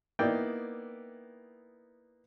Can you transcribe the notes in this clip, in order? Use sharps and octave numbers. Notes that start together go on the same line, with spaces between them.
A#3 B3 D#4 E4 D5 G5